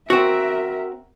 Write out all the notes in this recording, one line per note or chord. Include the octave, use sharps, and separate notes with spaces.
C4 F#4 A#4 E5